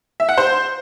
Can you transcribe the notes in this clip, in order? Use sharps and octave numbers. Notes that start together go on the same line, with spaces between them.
E5
F#5
C5